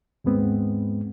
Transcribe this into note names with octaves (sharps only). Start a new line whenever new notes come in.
D#2 G#2 G#3 B3 C4